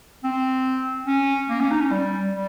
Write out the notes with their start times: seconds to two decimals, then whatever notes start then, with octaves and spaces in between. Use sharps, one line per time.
0.24 C4
1.07 C#4
1.50 A#3
1.60 C#4
1.71 D#4
1.81 C#4
1.91 G3
2.33 G3